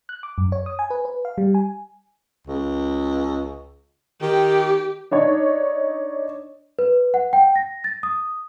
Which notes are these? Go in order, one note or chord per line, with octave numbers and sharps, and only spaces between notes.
F#6
D6
F#2
C#5
D#6
G#5
B4
B4
F5
G3
G#5
C#2
D#3 G4
D4 D#4 C#5
B4
F#5
G5
A#6
A6
D#6